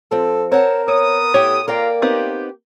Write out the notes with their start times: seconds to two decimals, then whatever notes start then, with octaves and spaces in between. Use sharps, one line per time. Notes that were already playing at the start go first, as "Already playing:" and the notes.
0.11 F3 C4 A4
0.52 C4 A#4 C#5 F#5 A5
0.88 B3 C#5 D#6
1.34 A2 G4 A4 C#5 G5
1.68 A#3 F4 A#4 D5 F5 G5 A#5
2.02 B3 C4 D#4 G4